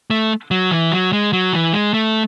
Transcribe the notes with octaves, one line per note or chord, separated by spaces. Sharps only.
A3
F#3
E3
F#3
G#3
F#3
E3
G#3
A3